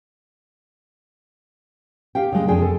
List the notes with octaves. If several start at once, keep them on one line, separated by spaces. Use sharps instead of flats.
G4 F5 G5
C#3 G#3
F2 C3 G#4 G5
A4